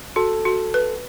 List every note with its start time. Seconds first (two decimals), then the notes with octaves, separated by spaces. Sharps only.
0.16 F#4 A4
0.45 F#4
0.74 B4